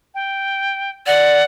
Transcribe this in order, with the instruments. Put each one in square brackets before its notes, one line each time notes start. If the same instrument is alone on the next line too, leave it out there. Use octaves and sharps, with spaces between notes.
[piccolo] G5
[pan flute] D5 [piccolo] F#5